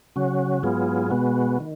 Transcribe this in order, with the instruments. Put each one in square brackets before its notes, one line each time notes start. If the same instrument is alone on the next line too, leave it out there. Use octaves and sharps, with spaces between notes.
[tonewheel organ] C#3 F#3 C#4 F#4
G#2 F#3 B3 F4 G#4
B2 G#3 B3 F#4
D#3